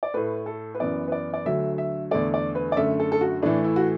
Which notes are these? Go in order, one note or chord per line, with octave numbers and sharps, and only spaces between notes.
D5
A2 A3 B4
A4
B4
F#2 E3 B3 D5
B4
D5
D5
D2 D3 F#3 A3 E5
E5
E2 D3 A3 D5
D5
B4
D5
F#2 D3 A3 E5
A4
A4
F#4
A2 E3 A3 D4
E4
F#4